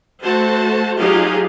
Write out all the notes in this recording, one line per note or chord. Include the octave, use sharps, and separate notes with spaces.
A3 F#4 C5 A5
F#3 D#4 F4 G4 G#4 F5